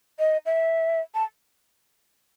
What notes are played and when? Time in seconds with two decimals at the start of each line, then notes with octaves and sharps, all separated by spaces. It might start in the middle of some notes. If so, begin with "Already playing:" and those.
0.19 D#5
0.46 E5
1.15 A5